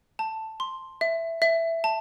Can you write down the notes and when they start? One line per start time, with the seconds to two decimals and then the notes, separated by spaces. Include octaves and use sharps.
0.19 A5
0.60 C6
1.01 E5
1.42 E5
1.84 A5